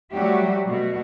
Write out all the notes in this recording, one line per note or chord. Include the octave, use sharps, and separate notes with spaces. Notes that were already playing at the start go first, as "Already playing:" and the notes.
F#3 G3 A3 F#4 G4 E5
B2 A3 F#4